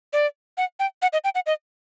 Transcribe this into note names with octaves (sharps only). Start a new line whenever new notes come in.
D5
F#5
G5
F#5
D#5
G5
F#5
D#5